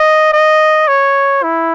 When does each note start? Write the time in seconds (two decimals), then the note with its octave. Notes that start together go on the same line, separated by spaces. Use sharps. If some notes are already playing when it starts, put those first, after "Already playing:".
Already playing: D#5
0.33 D#5
0.88 C#5
1.43 E4